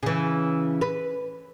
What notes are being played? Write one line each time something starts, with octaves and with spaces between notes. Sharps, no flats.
C#3 E3
B4